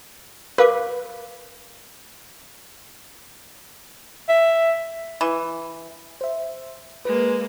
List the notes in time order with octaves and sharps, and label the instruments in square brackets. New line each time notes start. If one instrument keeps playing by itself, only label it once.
[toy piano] A#4 F5 D6 [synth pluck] B4
[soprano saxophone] E5
[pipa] E3
[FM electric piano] C5 E5
[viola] G#3 A#3 [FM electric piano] B4